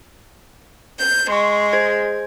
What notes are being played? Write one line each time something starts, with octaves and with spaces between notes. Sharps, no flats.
G6
G#3 C6 C#6
G#4 C5 G#6